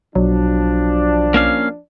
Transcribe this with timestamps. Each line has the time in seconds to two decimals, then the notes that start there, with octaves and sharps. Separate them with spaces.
0.15 B1 F3 F#3 D4
1.34 A#3 C#4 F5